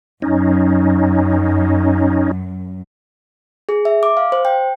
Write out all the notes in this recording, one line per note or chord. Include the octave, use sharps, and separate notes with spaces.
F#2 C#4 D#4
G#4
E5
D6
F5
C5
G5